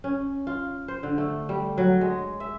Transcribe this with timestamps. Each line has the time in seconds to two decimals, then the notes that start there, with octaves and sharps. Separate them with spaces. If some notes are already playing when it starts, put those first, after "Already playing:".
0.04 C#4
0.47 F4
0.88 C5
1.03 D3
1.18 A3
1.49 G3
1.78 F#3
2.01 G#3
2.40 E5